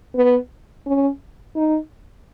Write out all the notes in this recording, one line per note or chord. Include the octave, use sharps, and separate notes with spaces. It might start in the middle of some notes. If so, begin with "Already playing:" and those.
B3
C#4
D#4